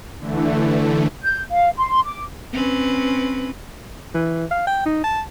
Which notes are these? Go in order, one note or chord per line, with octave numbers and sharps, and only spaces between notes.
D3 E3 A3
G6
F5
C6
D6
C4 C#4 B4
E3
F5
G5
D#4
A5